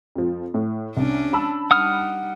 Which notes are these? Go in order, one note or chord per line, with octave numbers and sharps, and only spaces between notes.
F2 F3
A2
C2 C#4 D4
A5 B5 E6
G3 D#4 F#5 D#6 F6